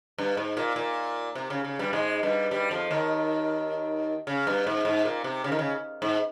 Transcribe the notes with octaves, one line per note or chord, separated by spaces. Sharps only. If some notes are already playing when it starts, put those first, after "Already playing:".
G2
G#2
A#2
A#2
C3
C#3
C#3
G2 G3
G#2 G#3
G2 G3
G2 G3
F2 F3
D#2 D#3
C#3
G2
G#2
G#2
A#2
C3
C#3
D#3
C#3
G#2